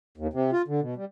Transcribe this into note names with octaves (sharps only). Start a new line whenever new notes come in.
D#2
C3
F4
D3
B2
G3